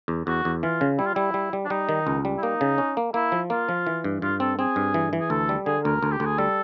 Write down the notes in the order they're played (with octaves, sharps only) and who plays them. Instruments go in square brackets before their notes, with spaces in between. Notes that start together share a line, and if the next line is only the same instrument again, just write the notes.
[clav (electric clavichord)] E2
[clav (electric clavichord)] E2 [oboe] F#4
[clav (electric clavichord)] E2
[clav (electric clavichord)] E3 [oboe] F4
[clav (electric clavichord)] C#3
[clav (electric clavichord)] G3 [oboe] E4
[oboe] F4
[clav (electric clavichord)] G3 [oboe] E4
[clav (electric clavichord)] G3
G3
[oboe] D4
[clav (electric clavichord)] G3 [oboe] D#4
[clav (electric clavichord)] D#3
C#2
G3
[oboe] E4
[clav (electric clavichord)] A#3 [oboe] D#4
[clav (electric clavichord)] C#3
C#4
A#3
[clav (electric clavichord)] A#3 [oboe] E4
[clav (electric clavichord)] F3
[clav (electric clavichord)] A#3 [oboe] F4
[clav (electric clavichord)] F3
E3
G2
[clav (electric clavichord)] G2 [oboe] F4
[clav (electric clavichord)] C4 [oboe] A4
[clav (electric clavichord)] C4 [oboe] G#4
[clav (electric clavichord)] G2
E3
E3
[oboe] G#4
[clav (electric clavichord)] D2 [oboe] A4
[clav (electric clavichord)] G3
[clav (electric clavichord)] D3 [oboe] G#4
[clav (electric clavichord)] D2 [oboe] A#4
[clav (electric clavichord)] D2
[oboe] G4
[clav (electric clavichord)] D2
[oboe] G#4
[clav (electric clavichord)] G3 [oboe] A4